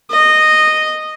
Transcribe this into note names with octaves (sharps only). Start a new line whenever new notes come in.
D#5